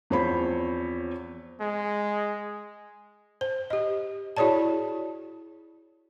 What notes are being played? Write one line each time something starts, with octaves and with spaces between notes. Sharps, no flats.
E2 F3 C4 C5 C#5 B5
G#3
C5
G4 D#5
E4 F#4 G#4 C#5 D5 A5